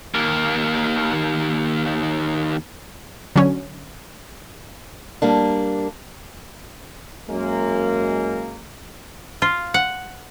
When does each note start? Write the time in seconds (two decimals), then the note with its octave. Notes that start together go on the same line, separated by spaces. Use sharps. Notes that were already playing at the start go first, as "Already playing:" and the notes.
0.14 D#2 A#3
3.36 D3 F#3 C#4
5.22 G3 A#3 D4
7.28 F#2 G#3 A#3
9.42 F4
9.74 F#5